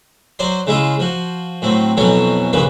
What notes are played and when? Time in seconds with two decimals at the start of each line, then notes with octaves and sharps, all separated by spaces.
0.39 F#3 C5 D5 C6
0.67 C#3 G#3 E4 F4
1.00 F3 F#4
1.62 A2 F#3 C4
1.97 F2 B2 E3 F#3 C#4 C#5
2.53 A#1 G2 C#3 A#3 B4